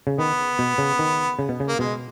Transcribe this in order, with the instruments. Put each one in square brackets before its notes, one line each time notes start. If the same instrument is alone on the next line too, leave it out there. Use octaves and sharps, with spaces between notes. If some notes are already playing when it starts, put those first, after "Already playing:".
[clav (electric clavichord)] C#3
[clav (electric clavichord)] D#3 [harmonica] B3
[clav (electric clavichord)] B2
C#3
D#3
C#3
B2
C#3
[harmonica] A#3
[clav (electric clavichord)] B2 [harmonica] G#3